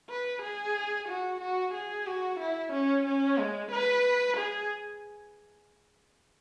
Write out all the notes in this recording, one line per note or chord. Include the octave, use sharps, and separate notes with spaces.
B4
G#4
F#4
F#4
G#4
F#4
E4
C#4
C#4
G#3
B4
G#4